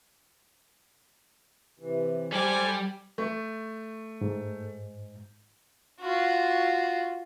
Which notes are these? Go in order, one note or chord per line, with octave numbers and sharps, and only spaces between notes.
C3 E3
G3 G4 A4 C5 G#5 D6
A3
G#2
F4 F#4